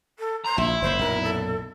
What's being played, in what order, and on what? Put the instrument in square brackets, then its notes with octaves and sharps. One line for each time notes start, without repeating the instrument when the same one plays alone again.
[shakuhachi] A4
[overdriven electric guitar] A#5 [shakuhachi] C6
[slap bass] A#1 [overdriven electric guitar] E4
[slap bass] F#1 G#2 [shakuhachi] C5
[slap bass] B1 F#2 A#2 [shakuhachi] A#4
[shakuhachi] A4